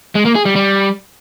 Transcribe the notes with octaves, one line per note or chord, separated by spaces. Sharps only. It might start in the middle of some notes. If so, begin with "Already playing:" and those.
G#3
A#3
G#4
G3
G3